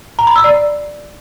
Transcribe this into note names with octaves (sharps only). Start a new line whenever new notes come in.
A#5
B5
E6
D5